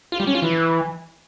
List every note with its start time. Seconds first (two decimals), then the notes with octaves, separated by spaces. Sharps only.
0.12 F4
0.20 G3
0.27 C#4
0.35 F4
0.42 E3